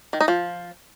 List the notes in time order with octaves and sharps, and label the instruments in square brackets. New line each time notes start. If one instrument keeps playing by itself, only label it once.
[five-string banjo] D#3
D#4
F3